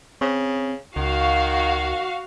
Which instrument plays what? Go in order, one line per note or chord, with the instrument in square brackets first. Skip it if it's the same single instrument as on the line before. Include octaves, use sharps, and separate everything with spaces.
[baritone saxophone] C#3 [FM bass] C4
[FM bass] C#2 [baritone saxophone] D#3 [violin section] F#4 F5